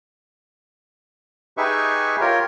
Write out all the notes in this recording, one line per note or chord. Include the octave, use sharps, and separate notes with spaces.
D#4 G4 G#4 B4 E5 C#6
F4 G4 A#4 C#5